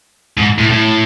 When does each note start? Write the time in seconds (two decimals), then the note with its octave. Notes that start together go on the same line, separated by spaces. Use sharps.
0.37 G#2
0.58 A2
0.70 A2